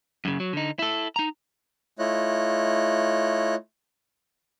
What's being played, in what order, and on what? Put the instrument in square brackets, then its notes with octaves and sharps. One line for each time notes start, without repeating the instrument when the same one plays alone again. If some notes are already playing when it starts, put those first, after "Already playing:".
[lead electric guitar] F#2 C#3
F#3
D3 D#4
E4 A4
D#4 A#5
[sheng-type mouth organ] A3 E4 F4 C#5 D#5 F#6